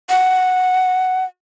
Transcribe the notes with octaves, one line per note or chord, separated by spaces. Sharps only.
F#5